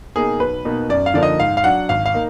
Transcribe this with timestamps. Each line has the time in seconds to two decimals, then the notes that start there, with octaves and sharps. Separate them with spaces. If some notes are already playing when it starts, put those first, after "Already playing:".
0.16 B2 A#3 D#4 G#4
0.40 B1 B4
0.65 B2 A#3 D#4
0.89 F#2 D5
1.06 F5
1.14 D3 F3 A#3 D#4 D5
1.23 D#5
1.40 G#2 F5
1.57 F5
1.64 F#3 D4 F#5
1.89 G#1 F5
2.06 F5
2.14 A#3 D#4